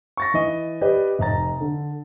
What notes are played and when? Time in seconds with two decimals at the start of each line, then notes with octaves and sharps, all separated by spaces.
0.17 C#6 A6 A#6
0.34 E3 D#5
0.81 G4 B4 D5 D#5
1.19 F1 D#5 A#5 A6
1.61 D3